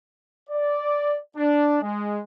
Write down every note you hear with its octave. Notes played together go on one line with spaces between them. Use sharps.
D5
D4
G#3